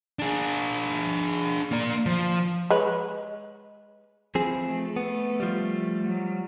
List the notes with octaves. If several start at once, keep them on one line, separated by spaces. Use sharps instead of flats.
D4 G#4
A#3 D5
F3
G#3 B4 C#5
E3 F3 C4 G#4
A3
B3
F3 G3
F#3